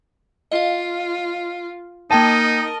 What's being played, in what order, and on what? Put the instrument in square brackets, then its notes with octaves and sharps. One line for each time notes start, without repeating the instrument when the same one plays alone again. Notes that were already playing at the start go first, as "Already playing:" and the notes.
[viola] F4 [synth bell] D#5 F5
[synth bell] A#3 G5 D#7 [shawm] D#4 [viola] A#4 D#5 [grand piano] A5